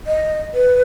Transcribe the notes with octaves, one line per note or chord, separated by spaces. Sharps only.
D#5
B4